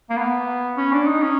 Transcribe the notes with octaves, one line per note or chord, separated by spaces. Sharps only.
A#3
B3
C#4
D4
D#4
C#4